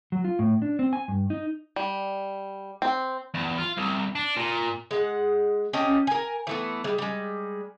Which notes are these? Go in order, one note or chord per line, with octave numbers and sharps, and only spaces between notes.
F#3
F4
A2
D4
C4
G#5
G2
D#4
G3
C4
E2
F4
C2
D4
A#2
G#3 F#5
C#4 G4 D#5 A5
A#4 G#5
E3 A3 B3
G3 G#3
G3 G#3